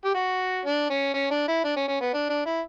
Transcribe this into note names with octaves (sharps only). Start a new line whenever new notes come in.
G4
F#4
D4
C#4
C#4
D4
E4
D4
C#4
C#4
B3
D4
D4
E4